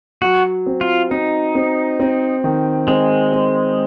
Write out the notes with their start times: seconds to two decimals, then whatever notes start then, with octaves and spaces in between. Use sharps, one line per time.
0.22 F#3 F#4
0.66 C4
0.81 F4
1.11 C4 D#4
1.55 C4
2.00 C4
2.44 D#3
2.88 G#3 C4
3.33 C4